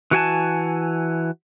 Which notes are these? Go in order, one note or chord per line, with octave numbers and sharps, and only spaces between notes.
E3 F#4 G#5 A5